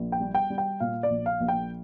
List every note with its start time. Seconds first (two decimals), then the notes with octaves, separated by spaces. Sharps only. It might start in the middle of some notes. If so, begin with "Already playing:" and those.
Already playing: A#1
0.12 G5
0.20 G3
0.35 G5
0.50 G3
0.58 G5
0.80 A#2 F5
1.03 D5
1.10 A#1
1.26 F5
1.40 A#1
1.48 G5